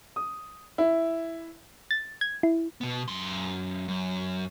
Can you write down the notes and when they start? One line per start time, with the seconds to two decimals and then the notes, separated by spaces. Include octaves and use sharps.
0.16 D#6
0.78 E4
1.91 A6
2.21 G#6
2.43 E4
2.81 B2 B3
3.08 F#2 C6
3.88 F#2